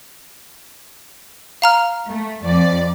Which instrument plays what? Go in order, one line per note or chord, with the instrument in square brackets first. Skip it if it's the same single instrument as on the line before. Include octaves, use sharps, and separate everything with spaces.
[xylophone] F5 A#5 F6
[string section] A3
F2 D5